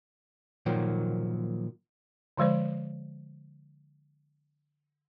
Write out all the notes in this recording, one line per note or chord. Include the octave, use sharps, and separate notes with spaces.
A#2 D#3 F3 F#3 A#3
D3 F3 G#3 C5 D5